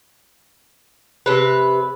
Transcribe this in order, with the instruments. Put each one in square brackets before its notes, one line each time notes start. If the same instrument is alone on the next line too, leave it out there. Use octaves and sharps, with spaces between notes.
[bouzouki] C3 B4